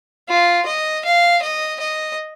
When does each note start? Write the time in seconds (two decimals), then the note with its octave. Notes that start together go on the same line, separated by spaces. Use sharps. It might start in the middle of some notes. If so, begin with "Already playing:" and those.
0.29 F4
0.66 D#5
1.05 F5
1.42 D#5
1.80 D#5